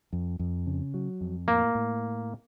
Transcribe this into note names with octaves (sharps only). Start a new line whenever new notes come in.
F2
F2
C#3
F#3
F2
A2 A#3
A2